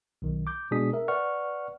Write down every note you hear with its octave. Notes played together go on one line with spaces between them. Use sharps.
B1 D#3
D6 G6
B2 G#3 D4 G#4 D#6 B6
A#4 E5
B4 D5 F#5 C#6 F6